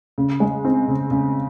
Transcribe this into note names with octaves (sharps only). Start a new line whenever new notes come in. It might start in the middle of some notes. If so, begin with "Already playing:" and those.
C#3
G#3
C4
C#3
C#3